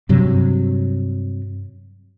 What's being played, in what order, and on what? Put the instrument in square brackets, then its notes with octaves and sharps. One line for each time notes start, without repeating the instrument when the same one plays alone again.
[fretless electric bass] G2 C3 F#3